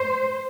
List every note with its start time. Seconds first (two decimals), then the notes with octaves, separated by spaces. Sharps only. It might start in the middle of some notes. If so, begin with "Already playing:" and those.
Already playing: C5